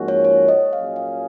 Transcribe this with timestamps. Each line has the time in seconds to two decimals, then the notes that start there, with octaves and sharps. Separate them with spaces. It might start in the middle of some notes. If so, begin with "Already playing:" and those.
Already playing: G#2 F3 A#3 C#4 F#4
0.08 C#5
0.24 C#5
0.48 D#5
0.72 A#2 F#3 C#4 G#4 F5
0.96 F5